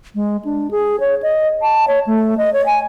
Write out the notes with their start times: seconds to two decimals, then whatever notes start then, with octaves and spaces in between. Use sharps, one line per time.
0.15 G#3
0.44 D4
0.71 G#4
1.00 C#5
1.22 D#5
1.62 A5
1.87 C#5
2.07 A3
2.38 D#5
2.53 C#5
2.66 G#5